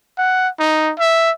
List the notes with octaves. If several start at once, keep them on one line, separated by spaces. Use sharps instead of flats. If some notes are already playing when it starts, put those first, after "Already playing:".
F#5
D#4
E5